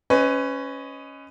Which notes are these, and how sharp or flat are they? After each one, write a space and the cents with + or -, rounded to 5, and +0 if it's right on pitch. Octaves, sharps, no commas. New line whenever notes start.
C#4 +0 B4 +30 D#5 +0